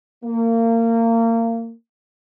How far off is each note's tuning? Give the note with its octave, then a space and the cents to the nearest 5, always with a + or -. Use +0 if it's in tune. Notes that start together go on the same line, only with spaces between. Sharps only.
A#3 -30